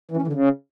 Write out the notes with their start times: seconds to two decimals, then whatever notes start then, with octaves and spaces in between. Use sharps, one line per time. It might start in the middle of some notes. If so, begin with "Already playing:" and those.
0.11 E3
0.17 C#4
0.22 E3
0.28 D3
0.33 C#3